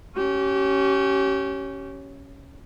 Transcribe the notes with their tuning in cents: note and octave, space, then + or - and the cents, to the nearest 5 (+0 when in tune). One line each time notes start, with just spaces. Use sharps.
C#4 +0 G4 -30